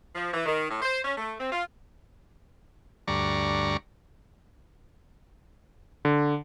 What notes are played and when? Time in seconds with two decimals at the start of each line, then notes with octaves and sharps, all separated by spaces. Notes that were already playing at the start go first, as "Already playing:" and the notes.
0.14 F3
0.33 E3
0.46 D#3
0.70 A2
0.82 C5
1.04 C#4
1.18 A3
1.39 C4
1.52 F4
3.08 D2 G2 D5 A#5 C#6
6.05 D3